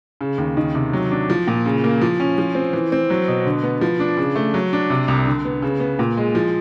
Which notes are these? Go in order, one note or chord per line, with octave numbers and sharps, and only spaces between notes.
C#3
D#2
D#3
C3
F#3
D4
F3
A#2
C#3
A#3
F3
C#4
F3
C4
E3
C4
F#3
B2
D3
B3
F3
D4
C#3
A3
F#3
D4
C3
C2
D3
B3
C#3
B3
A#2
G#3
F3